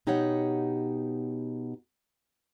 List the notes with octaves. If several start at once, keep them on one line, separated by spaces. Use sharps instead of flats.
B2 D#4 G4 C#5 F#5